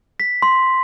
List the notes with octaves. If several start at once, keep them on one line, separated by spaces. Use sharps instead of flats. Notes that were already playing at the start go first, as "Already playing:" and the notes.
B6
C6